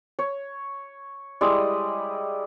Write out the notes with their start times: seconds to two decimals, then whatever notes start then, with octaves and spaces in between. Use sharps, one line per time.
0.19 C#5
1.41 G3 G#3 E4 D#5